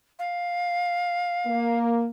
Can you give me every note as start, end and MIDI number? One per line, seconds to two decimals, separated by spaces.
0.19 1.78 77
1.47 2.08 58